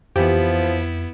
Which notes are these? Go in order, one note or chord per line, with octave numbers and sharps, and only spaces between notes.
F2 E3 F3 B3 E4 G4